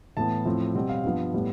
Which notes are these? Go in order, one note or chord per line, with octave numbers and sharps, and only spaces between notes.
A2 E3 B3 A5
A2 F3 C4
B2 G3 C4
F5
G2 F3 B3
A2 G3 B3